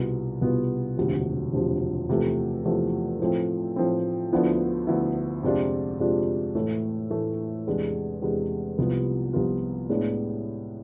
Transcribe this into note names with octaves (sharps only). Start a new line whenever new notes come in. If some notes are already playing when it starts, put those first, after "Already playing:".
Already playing: C2 B2 B3 F4
C2 B2 B3 F4
E1 D2 C3 F3
E1 D2 C3 F3
E2 C3 F3 A3
E2 C3 F3 A3
A2 F3 A3 C4
A2 F3 A3 C4
D2 D3 F3 B3 E4
D2 D3 F3 B3 E4
F2 C3 G#3 D4 F4
F2 C3 G#3 D4 F4
A2 E3 A3
A2 E3 A3
E2 C3 G#3 D4
E2 C3 G#3 D4
C2 C3 F3 B3 F4
C2 C3 F3 B3 F4
A2 G#3 B3 D4